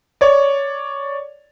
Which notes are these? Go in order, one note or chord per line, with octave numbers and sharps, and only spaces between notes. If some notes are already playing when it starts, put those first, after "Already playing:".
C#5 D5